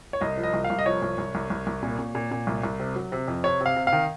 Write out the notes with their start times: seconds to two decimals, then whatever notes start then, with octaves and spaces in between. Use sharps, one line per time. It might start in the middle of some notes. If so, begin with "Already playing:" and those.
0.13 C#5
0.21 C2 D#5
0.38 F3
0.43 D#5
0.54 C2
0.64 F5
0.70 C2
0.79 D#5
0.86 F3 C#5
1.02 C2
1.18 C2
1.35 C2
1.50 C2
1.67 C2
1.83 A#2
1.99 A#2
2.15 A#2
2.31 A#2
2.47 C2
2.64 C2
2.79 C3
2.96 F#3
3.12 C3
3.28 F2
3.44 C3 C#5
3.61 C3
3.66 F5
3.76 C3
3.87 F5
3.93 D#3